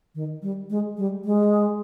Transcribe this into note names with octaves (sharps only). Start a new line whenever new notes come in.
D#3
G3
G#3
G3
G#3